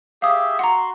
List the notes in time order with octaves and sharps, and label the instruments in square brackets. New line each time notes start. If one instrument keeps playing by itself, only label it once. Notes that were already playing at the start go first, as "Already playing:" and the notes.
[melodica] G4 G#4 E5 [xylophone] F5 D#6
[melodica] F#4 C6 [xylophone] F#5 A#5